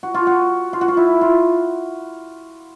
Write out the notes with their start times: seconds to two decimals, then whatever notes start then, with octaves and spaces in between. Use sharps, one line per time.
0.03 F#4
0.14 F4
0.27 F#4
0.73 F4
0.81 F#4
0.88 F4
0.97 E4
1.21 F4